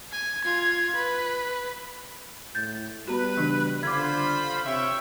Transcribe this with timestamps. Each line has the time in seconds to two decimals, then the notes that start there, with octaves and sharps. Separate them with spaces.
0.12 G#5
0.45 F4 G#6
0.96 B4
2.55 A2 G6 A6
3.07 G3 B3 F#4 B4
3.37 C#3 E3 D4
3.83 D3 F4 C5 B5 D6 G#6
4.65 C3 C#5 E5 G5